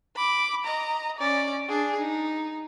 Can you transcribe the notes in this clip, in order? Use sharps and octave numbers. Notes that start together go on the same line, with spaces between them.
B5 D6
D#5 A#5
C#4 D5
D4 G#4
D#4